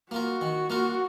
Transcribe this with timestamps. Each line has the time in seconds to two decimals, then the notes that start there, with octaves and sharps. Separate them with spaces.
0.11 A#3 F4 F#4 A#4
0.41 D#3
0.70 A#3 F4 A#4